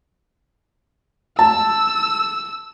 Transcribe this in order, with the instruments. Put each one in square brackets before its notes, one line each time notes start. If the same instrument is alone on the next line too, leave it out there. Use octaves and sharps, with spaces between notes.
[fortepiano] A5 [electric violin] E6